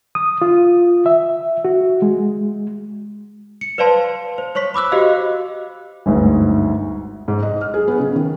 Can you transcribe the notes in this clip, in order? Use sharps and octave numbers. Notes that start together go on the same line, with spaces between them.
D#6
F4
E5
F#4
G#3
C#7
B4 C5 D5 F5 A5 C6
C5
C5 C#5 C#6 B6
B5 D6 E6 F#6
F#4 G4 C5 D#5 F5
G1 D2 G#2
G#2
D#5
F6
G#4
B3
C#3
D#3